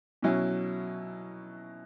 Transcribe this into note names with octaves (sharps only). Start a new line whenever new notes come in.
B2 F#3 C#4 E4